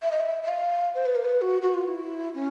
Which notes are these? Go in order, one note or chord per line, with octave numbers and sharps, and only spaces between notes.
E5
D#5
E5
E5
F5
C5
B4
A#4
B4
F#4
F#4
F4
E4
C#4